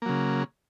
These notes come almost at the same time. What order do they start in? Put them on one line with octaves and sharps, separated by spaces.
A#3 F#3 C#3